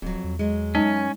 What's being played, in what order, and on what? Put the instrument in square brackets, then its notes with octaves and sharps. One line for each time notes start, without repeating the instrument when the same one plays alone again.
[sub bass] D1 [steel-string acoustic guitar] F2 F#3
[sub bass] E2
[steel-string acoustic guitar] F#3 G#3
[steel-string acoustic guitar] F#2 [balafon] G#3 D#4 [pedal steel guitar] C#4